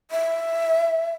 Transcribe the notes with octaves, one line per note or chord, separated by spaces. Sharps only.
E5